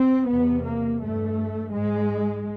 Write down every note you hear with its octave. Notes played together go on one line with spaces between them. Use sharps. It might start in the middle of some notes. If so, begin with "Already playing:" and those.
Already playing: C4
E2 C3 B3
A#3
G2 A3
G#2 G#3